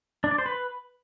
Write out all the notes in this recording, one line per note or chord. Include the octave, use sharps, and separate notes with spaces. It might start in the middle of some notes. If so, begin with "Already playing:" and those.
D4
D5
C5
B4